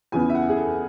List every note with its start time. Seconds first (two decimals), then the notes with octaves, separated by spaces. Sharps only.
0.12 E2 C#3 E3 B3 G#5
0.30 E5
0.35 F#5
0.49 G#4
0.56 A4